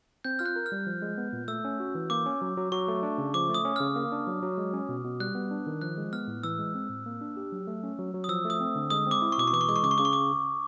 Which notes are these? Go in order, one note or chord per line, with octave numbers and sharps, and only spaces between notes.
C4 G6
F4 F6
F#6
A#4
F6
G3
F3
G#3
B3
A#2
A3 E6
C#4
F#4
E3
A#3 D6
C#4
F#3
F#3
F#3 C#6
A3
D4
C#3
F3 D6
A3
D#6
C#4
C#3 F6
A#3
D4
F#3
F#3
G#3
C#4
B2
B2
G3 F#6
B3
D4
D#3
F3 F#6
G#3
B3 F6
A2
E3 E6
G#3
C4
A2
A#3
D4
G4
F#3
A3
C#4
F#3
F#3
D#6
F3 E6
A3
D#6
C4
D3
G#3 D#6
C4 D6
E4
C#6
B2 D6
C#6
E3 D6
C#6
G#3 D6
C#6
C#3 D6
C#6
C#3 D6
C#6
D6